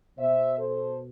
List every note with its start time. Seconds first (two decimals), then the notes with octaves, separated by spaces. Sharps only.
0.17 B2 C5 E5
0.58 A4 C5